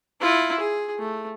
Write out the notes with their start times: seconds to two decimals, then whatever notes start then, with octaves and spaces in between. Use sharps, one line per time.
0.21 E4 F4
0.60 G#4
0.99 A3